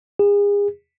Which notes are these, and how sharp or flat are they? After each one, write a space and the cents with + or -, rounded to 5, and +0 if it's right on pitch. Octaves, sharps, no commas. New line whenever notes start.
G#4 -35